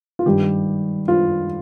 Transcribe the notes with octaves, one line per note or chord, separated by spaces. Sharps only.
F4
G2 D#3 G4
F4